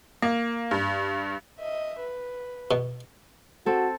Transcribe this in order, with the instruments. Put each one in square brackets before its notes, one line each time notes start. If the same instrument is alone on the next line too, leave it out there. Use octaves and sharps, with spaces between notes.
[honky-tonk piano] A#3
G2
[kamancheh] D#5 E5
B4
[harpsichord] B2
[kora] C4 A4 [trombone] F#4